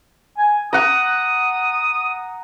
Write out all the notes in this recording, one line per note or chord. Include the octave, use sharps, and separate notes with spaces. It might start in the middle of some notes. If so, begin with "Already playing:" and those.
G#5
F#5 A#5 D#6